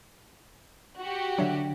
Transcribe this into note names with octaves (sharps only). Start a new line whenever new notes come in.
F#4 G4
D3 F#3 D4 C#5 E5